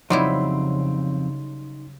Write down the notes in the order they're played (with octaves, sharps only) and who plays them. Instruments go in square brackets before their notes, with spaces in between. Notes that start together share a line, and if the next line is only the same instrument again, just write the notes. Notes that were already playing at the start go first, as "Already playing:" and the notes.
[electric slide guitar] F2 C4 [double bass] C#3 [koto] F#3 G3 E4 [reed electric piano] D#4 C6